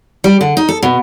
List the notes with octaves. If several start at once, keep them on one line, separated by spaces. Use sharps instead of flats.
G3
D3
D#4
A4
B2